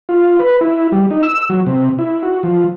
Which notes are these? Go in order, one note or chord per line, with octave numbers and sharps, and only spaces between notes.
F4
B4
E4
G3
D#4
E6
F#3
C3
E4
F#4
F3